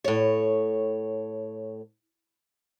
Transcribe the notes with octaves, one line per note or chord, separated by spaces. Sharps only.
A2 C#5